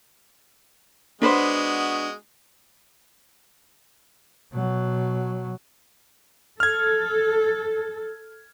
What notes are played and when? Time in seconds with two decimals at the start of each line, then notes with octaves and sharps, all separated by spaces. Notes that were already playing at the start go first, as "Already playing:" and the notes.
1.22 G#3 B3 D4 F#4 B4 C5
4.53 B2 F#3
6.60 A4 F6 G#6